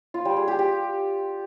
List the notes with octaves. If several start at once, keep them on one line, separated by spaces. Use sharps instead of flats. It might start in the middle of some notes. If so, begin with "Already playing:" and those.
F4
G3
G#4
G4
G4